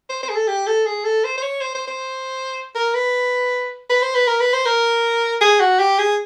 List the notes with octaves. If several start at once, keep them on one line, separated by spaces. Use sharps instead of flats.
C5
C5
G#4
A4
G4
A4
G#4
A4
C5
C5
C#5
C5
C5
C5
A#4
B4
B4
C5
B4
A#4
B4
C5
A#4
G#4
F#4
G4
G#4